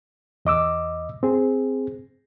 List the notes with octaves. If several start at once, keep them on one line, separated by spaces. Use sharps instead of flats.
E2 D#5 D6 E6
C4 G#4